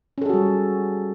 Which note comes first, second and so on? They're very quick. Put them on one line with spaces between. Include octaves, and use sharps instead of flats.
C#4 A4 G#4 F#4 G3